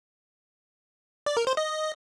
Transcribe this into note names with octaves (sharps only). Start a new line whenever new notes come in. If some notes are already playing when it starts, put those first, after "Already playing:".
D5
A#4
C5
D#5